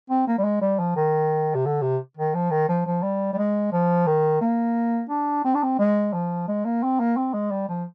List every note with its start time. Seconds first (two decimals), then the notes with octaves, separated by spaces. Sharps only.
0.10 C4
0.28 A#3
0.38 G3
0.44 G#3
0.61 G3
0.79 F3
0.96 D#3
1.55 C3
1.65 D3
1.82 C3
2.17 D#3
2.35 F3
2.51 D#3
2.68 F3
2.86 F3
3.03 G3
3.33 G3
3.38 G#3
3.73 F3
4.07 D#3
4.41 A#3
5.09 D4
5.45 C4
5.55 D4
5.63 C4
5.79 G#3
6.13 F3
6.48 G#3
6.65 A#3
6.83 C4
7.00 A#3
7.17 C4
7.34 G#3
7.51 G3
7.69 F3